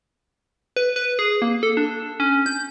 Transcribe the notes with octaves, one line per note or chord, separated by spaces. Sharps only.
B4
B4
G#4
A#3
A4
D4
C#4
G6